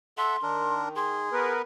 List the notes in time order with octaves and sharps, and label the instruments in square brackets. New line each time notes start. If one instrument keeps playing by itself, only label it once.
[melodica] A4 E5 F#5 [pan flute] C6
[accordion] D#3 [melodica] D4 A#4
[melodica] G#4 [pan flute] C6
[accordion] B3 A#4 B4